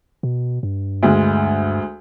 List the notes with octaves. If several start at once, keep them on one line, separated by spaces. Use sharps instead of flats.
B2
G2
D2 G#3